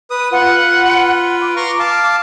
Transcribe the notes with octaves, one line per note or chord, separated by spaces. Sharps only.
B4 D#6
F4 B4 F#5
D6
A#5 C6 C#6
F5 A5